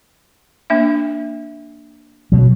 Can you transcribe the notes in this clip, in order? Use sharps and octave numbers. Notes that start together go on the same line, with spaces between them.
A#3 D4 E5
B2 F#3